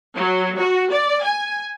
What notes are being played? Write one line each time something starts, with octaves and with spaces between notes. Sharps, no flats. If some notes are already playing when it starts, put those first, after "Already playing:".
F#3
F#4
D5
G#5